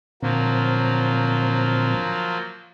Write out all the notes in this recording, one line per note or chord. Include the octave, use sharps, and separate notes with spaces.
A#2 D3 F3 F#3 A#3 C4